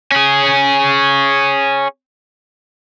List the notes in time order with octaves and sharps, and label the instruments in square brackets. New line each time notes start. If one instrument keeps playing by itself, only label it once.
[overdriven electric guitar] C#4 G#4